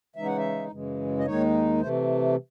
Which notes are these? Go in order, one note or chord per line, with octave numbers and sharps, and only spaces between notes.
C#3 E3 G#3 D#4 E5
F#5
E5
F#2 C#3 E3 G#3
D#5
D#2 D#3 G#3 D#4 C#5
C3 E3 A3 C5